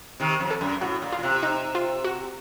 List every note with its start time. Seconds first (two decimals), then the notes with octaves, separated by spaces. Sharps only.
0.20 C3 D#3
0.40 F2
0.51 A4
0.61 F#2
0.81 A2 F#4
1.02 A#2
1.12 F4
1.19 A#2
1.23 C3
1.43 D#4
1.75 F4
2.04 F#4